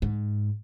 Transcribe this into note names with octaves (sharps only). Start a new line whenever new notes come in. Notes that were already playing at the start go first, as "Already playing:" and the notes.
G#2